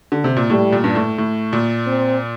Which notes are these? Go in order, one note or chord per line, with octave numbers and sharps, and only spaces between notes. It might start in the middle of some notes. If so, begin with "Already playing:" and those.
D3
C3
A#2
A2 G3
A#2
G2
A2
A2
A#2
C4